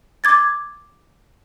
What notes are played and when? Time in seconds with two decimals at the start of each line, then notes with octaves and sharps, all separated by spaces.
0.24 D6 G#6 A6